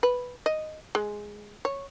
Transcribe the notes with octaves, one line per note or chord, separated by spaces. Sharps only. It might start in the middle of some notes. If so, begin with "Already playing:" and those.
B4
D#5
G#3
C#5